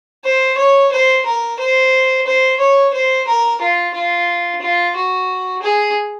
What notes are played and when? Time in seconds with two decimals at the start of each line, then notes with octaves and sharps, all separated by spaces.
0.24 C5
0.57 C#5
0.92 C5
1.25 A#4
1.59 C5
2.26 C5
2.59 C#5
2.93 C5
3.27 A#4
3.61 F4
3.94 F4
4.61 F4
4.96 F#4
5.62 G#4